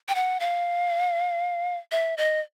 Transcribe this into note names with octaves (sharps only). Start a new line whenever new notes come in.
G5
F#5
F5
E5
D#5